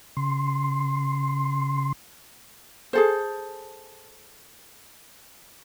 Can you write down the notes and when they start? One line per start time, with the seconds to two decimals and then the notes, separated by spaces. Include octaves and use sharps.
0.17 C#3 C6
2.93 G#4 A4 C5